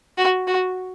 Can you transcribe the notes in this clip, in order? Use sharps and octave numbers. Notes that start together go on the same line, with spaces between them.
F#4
F#4